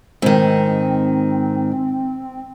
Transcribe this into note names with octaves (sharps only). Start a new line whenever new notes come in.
G#2 D#3 C4